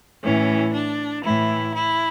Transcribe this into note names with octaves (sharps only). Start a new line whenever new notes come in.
A2 E3 C#4
D4
A2 E3 E4
E4